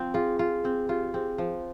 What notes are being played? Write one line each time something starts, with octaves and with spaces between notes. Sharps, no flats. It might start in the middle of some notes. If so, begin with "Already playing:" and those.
Already playing: F3 C4
F4 G#4
F4 G#4
C4 G#4
F4 G4
C4 G#4
F3 C5